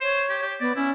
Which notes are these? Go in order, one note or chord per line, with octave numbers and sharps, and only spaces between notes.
C5 C#5
G4
G4
B3 D5
C#4 E4